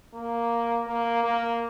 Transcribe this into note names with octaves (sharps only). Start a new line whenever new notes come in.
A#3
A#3
A#3